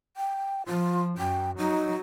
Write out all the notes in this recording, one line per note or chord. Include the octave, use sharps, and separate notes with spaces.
G5
F3 F4
F#2 G5
F#3 D#4